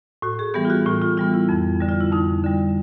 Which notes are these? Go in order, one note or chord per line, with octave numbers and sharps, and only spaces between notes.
A2 F#4
G#4
E3 G3 B3 G4
F4
F#4
A2 F4
F4
E3 G3 B3 F4
E4
F2
D3 G3
F4
E4
F2 D#4
D3 G3